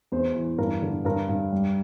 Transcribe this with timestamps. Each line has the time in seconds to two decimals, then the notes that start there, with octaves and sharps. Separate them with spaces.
0.12 E2 C5
0.35 E3
0.58 G2 A#4
0.82 D3
1.05 G2 A#4
1.29 G2
1.52 G3